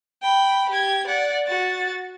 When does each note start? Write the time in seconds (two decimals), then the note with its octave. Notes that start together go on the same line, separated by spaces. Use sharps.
0.22 G5 B5
0.70 G4 G#6
1.07 D5 F#5
1.47 F#4 A6